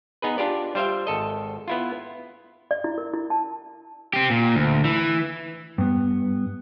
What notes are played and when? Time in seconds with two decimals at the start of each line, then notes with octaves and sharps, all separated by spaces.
0.22 B3 D#4 G#4 B4
0.38 D4 F4 G4 D5
0.75 G3 F4 C5 E5 F5 G5
1.07 G#1 A4 D#5
1.68 B3 E4 F4
2.71 D5
2.84 E4
2.98 A#4
3.13 E4
3.30 A5
4.13 C4 G4
4.30 A#2
4.55 D2
4.85 E3
5.78 G2 B3